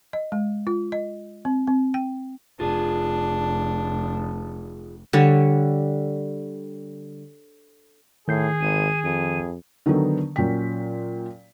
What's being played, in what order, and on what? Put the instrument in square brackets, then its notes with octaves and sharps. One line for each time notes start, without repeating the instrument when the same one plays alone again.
[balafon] D#5
G#3
F4
D#5
C4
C4
G5
[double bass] F1 [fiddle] D4 [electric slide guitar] F4 G#4
[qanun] D3 G3 C#5
[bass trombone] A2 [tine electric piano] D#3 G6 C7 [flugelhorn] G#4
[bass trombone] G#1 [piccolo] D#7
[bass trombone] F2 [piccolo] D#7
[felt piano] D3 D#3 F#3 B3 D#4 A4
A#2 F#3 C#4 G5 B6